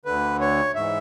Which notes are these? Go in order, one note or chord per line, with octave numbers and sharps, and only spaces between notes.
D2 D3 B4
C#5
G#2 E3 E5